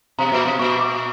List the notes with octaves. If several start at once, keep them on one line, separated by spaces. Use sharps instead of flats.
B2 A#5
A#2
B2
A#2 C#6
D6